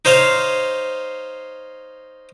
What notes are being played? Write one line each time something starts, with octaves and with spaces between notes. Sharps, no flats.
D#4 C5 C#5 F5